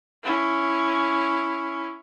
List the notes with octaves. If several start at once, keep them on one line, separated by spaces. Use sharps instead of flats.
C#4 E4